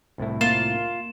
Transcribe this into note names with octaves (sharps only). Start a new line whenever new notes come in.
C2 A2 E4
A#3 F4 E7